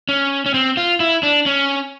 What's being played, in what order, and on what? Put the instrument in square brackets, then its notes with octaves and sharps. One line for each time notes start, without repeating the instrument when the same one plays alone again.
[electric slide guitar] C#4
C#4
C4
F4
E4
D4
C#4